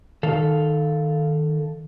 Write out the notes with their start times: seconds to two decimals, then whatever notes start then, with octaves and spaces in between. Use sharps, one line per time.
0.23 D#3 A4 F5